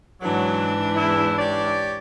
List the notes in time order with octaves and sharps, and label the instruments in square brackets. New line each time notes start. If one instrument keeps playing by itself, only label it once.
[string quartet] G#2 E3 D4 [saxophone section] F#3
[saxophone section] E2 E4
G4 C#5 D5